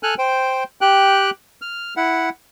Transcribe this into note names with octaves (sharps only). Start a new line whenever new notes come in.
A4 G#5 F6 F#6
C5 G5
G4 G5 F#6
F6
E4 F#5